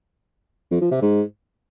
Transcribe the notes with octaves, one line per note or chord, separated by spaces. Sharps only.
F2
F3
C3
G#2